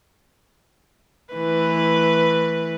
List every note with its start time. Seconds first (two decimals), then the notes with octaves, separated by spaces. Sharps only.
1.33 E3 A3 B4